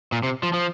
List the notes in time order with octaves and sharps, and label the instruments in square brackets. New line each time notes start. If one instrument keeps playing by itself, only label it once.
[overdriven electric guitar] A#2
C3
F3
F3